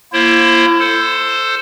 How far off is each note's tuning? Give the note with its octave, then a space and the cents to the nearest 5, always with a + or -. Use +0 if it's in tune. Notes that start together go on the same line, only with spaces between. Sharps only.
A#3 +15 E4 +35 C5 +25
A4 +10 C5 +0